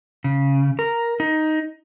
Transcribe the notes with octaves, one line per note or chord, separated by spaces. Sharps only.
C#3
A#4
D#4